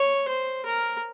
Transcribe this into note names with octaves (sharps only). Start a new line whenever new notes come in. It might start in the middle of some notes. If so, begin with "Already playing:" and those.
Already playing: C#5
C5
A#4